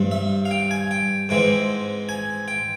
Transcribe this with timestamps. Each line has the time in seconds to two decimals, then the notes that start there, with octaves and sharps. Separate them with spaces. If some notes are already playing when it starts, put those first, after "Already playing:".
Already playing: G2 G3 C4
0.11 E5
0.45 F5
0.51 G5
0.71 G#5
0.91 G5
1.29 G#2 E3 G#3 C4 G5
2.09 G#5
2.48 G5